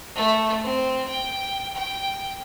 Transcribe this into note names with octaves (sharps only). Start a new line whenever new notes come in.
A3
C4
G5
G5